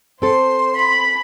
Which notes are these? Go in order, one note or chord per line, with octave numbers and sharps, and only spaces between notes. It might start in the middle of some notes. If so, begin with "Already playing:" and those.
C4 A4 C5 C6
B5